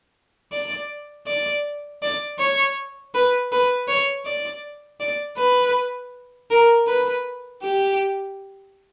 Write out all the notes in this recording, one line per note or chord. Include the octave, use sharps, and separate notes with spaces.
D5
D5
D5
C#5
B4
B4
C#5
D5
D5
B4
A#4
B4
G4